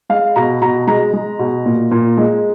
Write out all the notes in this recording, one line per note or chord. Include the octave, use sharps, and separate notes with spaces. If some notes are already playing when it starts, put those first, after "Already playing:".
G#3 F5
B2 A#5
B2 A#5
G#3 A#5
G#3
B2
A#2
A#2
G#3